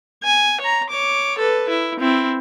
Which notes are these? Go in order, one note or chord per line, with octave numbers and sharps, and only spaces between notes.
G#5
C#5 A#5
C#5 D6
A4 B4
E4
C4 E4